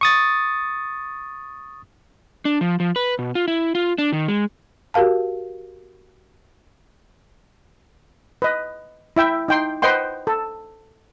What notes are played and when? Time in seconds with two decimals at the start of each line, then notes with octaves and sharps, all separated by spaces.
0.01 C#6 D#6 A6
2.45 D4
2.61 F3
2.80 F3
2.96 B4
3.19 B2
3.35 F4
3.48 E4
3.75 F4
3.98 D4
4.13 D#3
4.28 G#3
4.94 F#4 G4 A#4 F5 A5
8.42 B4 D#5
9.16 E4 E5 G5
9.48 D#4 G5 C6
9.82 B4 C5 D#5 F#5 G5 C6
10.27 A4